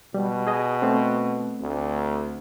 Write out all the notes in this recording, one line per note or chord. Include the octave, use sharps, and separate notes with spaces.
B2 G3
G#4 D#5
A3 C4
D2